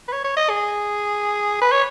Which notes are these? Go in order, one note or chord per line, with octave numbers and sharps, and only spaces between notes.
B4
C#5
C#5
D#5
G#4
B4
C#5